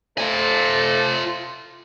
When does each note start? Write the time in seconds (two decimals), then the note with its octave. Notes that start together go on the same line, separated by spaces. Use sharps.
0.18 A3 F4 A4 C5 G#5